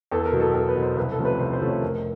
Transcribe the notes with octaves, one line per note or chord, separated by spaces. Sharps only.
E2 A4
A#4
B2 F#3
A4
E2 A#4
B4
B2 F#3
C5
C2 B4
A4
C3 F3 A3 C#4
B4
C2 C5
C5
C3 F3 A3 C#4
C#5
F1 A#4